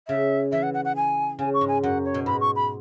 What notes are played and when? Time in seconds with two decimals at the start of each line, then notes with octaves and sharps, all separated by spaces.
0.08 C#3 E5
0.52 E3 E5
0.63 F#5
0.74 F#5
0.85 F#5
0.96 G#5
1.39 C#3 G#5
1.54 C#6
1.61 G#2
1.68 G#5
1.83 F#2 F#5
2.05 C#5
2.14 B2
2.26 G#2 B5
2.41 C#6
2.56 B5